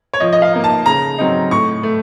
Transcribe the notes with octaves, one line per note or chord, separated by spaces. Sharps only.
C#5
F3 D#5
D#5
F5
A#3 D#4
A5
C#3 A#5
F#3 C4 D#4
A2 C#6
A3